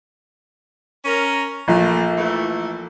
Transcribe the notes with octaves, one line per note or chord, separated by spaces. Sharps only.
C#4 A#4
A#1 A3 A#3
E3 A3